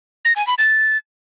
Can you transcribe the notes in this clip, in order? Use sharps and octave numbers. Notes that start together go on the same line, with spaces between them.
A#6
G#5
B5
A6